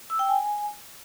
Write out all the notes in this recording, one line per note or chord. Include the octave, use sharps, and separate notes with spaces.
E6
G5
G#5